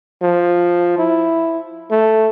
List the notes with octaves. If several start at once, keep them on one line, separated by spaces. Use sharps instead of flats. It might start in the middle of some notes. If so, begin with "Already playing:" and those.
F3
E4
A3